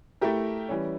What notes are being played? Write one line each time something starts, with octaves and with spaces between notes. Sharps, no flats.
A3 E4 G4 A#4
E3 G3 C#4